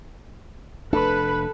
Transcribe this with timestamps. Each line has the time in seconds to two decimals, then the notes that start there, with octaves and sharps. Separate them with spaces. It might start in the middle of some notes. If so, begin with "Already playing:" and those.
0.93 F1 A3 D4 A4 B4